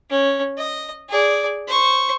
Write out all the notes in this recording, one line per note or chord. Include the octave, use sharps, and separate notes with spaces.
C#4
D#5
G#4 D5
C5 C#6